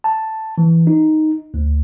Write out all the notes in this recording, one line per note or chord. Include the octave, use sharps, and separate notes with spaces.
A5
E3
D#4
D2